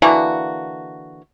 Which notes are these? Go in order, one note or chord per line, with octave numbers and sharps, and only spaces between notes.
D3 E3 A#3 F#4